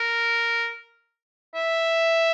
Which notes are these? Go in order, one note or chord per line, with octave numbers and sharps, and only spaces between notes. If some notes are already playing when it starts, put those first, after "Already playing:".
Already playing: A#4
E5